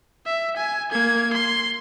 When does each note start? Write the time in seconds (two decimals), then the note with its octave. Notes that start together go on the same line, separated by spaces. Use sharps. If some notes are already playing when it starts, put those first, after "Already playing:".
0.26 E5
0.56 G#5
0.92 A#3 G#6
1.33 C6